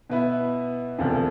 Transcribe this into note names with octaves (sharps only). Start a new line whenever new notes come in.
B2 B3 E4 B4
E1 D2 C3 F3